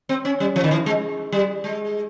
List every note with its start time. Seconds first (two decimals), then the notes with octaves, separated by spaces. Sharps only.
0.09 C4
0.25 C#4
0.40 G3
0.56 F3
0.64 D#3
0.71 E3
0.86 G#3
1.32 G3
1.64 G#3